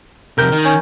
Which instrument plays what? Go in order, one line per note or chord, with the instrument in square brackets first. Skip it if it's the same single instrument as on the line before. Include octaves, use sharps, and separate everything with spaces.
[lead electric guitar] F2 C3 [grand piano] A#4 G6
[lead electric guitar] D#3
[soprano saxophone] C#4